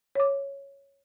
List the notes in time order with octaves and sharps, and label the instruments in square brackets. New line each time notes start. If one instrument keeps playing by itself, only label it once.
[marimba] C#5 D6